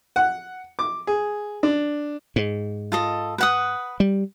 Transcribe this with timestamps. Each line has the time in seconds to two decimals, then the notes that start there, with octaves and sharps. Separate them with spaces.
0.16 F#5
0.79 D6
1.07 G#4
1.63 D4
2.36 G#2
2.92 F4 A4 D#5
3.38 B4 F#5 D#6
4.00 G3